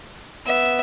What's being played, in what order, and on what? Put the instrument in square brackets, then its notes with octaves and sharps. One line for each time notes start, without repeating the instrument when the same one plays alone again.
[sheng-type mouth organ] B3 [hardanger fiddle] E5